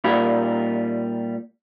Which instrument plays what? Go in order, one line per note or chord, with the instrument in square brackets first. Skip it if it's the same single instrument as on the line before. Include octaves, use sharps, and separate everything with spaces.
[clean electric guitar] A#2 G3 F4 B5